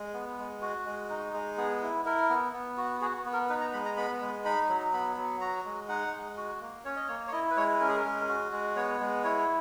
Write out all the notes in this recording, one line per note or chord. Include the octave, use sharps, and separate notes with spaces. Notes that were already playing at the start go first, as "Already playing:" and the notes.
Already playing: G#3
B3
G#3
F#4
G#3
D#4
G#3
B3 G#4
E4
E4 A#4
B3
B3
F#4
F#4 G#4
F#4
B3
A#4
D#4 B4
A#5
G#3 B5
A#5
B3 B5
G#3
D#4 B5
F#3
B3 B5
F#3
F#4 A#5
G#3
D#4 F#5
G#3
F#4
A#3
C#4 C#5
D#5
A#3 C#5
C#5
E4 D#5
B4
G#3 C#5
C#4 A#4
G#4
A#4
G#3
F#4
G#3
B3 C#5
G#3
E4 C#5